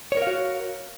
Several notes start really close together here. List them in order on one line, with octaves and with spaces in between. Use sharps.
C#5 A#4 F5 F#4